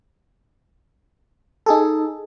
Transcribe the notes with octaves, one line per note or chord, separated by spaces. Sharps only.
D#4 G#4 A4